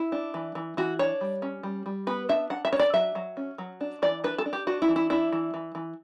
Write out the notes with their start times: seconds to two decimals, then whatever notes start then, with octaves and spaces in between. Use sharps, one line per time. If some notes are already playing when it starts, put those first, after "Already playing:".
Already playing: E4
0.12 D4
0.34 E3
0.55 E3
0.77 E3 F#4
0.99 D4 C#5
1.21 G3
1.42 C#4
1.63 G3
1.86 G3
2.07 B3 B4
2.29 D4 E5
2.50 D4 F#5
2.65 E5
2.73 D4 C#5
2.80 D5
2.94 F#3 E5
3.15 F#3
3.37 C#4
3.58 F#3
3.81 D4
4.02 E3 D5
4.24 D4 B4
4.38 A4
4.46 D4
4.53 G4
4.67 D4 F#4
4.82 E4
4.88 E3
4.96 E4
5.10 D4 E4
5.33 E3
5.54 E3
5.75 E3